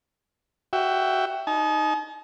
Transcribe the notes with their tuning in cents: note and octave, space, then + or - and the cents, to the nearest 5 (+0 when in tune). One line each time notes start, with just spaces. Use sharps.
F#4 +20 E5 +10 G5 +0
D#4 +0 A5 -45